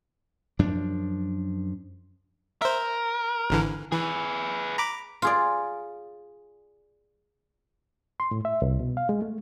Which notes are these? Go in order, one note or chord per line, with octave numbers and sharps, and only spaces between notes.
F#2 F3 D4
A#4 C5 E5
G#1 D3 E3
E3 G#4 B4
A#5 B5 D6
F4 G#4 D5
C6
A2
E5
C2
B2
F5
G#3
A3